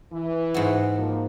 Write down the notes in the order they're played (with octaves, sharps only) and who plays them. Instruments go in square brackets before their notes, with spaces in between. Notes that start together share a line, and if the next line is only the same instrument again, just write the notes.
[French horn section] E3
[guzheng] G#2 F#4
[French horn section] F3 A#3